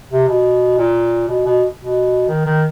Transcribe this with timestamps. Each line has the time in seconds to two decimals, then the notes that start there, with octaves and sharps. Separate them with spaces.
0.11 C3
0.28 B2
0.78 A#2
1.29 B2
1.45 B2
1.78 B2
2.28 D#3
2.46 D#3